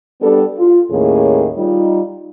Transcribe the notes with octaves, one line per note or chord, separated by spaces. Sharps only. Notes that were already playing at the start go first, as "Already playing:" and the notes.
G3 B3 D4 G4 A4
F4
D#2 A2 D#3 A#3 C#4 G#4
G3 D#4 F4